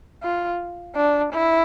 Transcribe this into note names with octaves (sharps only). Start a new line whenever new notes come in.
F4
D4
E4